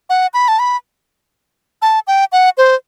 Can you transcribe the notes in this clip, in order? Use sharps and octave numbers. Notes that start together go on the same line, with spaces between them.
F#5
B5
A5
B5
A5
G5
F#5
C5